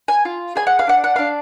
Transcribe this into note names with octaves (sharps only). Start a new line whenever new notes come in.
G#5
F4
G#4 G#5
F#5
F5
D4 F#5
F#5
D4 F5